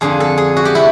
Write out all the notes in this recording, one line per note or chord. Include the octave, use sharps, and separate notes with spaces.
F2 D3 F3 G#4
A4
G#4
F#4
G4
C3 E4